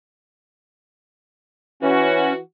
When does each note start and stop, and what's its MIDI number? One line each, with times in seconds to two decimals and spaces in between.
1.83 2.39 52
1.83 2.33 61
1.83 2.38 66